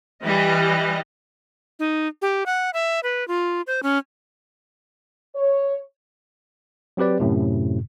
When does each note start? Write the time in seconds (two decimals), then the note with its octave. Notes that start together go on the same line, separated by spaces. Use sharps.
0.24 E3 G3 D#5
1.79 D#4
2.22 G4
2.46 F#5
2.74 E5
3.03 B4
3.28 F4
3.67 C5
3.83 C#4
5.36 C#5
6.97 F#3 C4 G4 B4 D5
7.20 F#2 A2 C3